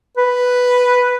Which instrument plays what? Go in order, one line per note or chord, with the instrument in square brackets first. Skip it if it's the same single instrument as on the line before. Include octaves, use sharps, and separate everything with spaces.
[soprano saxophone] B4